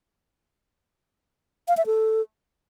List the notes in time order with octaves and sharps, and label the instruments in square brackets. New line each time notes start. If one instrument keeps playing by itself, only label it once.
[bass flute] F5
E5
A4